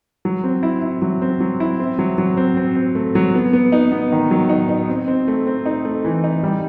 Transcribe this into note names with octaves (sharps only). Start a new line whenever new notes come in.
F#3
C4
E4
E4
F#3
C4
F#3
E4
C4
F#3
F#3
C4
C4
C4
A3
F#3
B3
B3
D#4
B3
D#3
F#3
D#4
D#4
C4
C4
A3
C4
D#4
A3
E3
D#4
G3